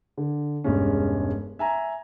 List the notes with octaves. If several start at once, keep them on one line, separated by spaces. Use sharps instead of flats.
D3
E1 G2 G#3 C#4
E5 G#5 A#5